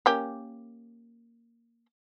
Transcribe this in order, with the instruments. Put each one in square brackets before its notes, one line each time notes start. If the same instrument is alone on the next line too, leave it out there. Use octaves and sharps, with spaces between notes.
[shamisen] A#3 C#4 G4